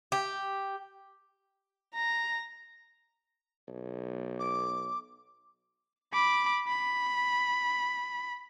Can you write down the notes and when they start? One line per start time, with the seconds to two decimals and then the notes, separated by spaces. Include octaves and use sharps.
0.12 G4
1.94 A#5
3.68 B1
4.39 D6
6.13 B5 D6
6.68 B5